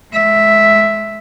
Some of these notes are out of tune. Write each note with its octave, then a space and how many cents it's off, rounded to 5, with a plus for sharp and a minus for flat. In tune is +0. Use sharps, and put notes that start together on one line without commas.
G#3 +25 E5 +0